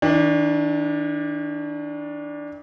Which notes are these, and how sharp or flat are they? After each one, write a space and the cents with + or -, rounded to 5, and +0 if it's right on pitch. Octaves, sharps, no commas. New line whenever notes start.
D#3 +45 D4 +0